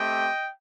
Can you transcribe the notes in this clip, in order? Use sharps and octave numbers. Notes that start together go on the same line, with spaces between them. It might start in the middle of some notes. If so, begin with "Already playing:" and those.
Already playing: A3 C4 G4 D#5 G5